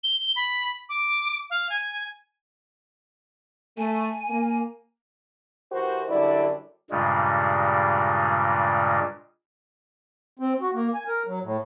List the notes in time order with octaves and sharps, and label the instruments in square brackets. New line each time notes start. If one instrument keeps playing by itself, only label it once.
[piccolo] G7
B5
D6
F5
G#5
[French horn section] A3 [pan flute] G#5
[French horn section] A#3
E3 F#4 G4 A#4 C5
F#2 D3 G3 E4 D5
[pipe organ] G2 A#2 C#3 G3 G#3
[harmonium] C4
F#4
A#3
G#5
A#4
F#3
A2